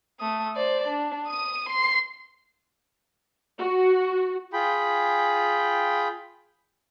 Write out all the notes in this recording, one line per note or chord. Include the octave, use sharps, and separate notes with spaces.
A3 D#6
C5 D5
D4
D#6 D#7
C6 C7
F#4
F4 G#4 G5 B5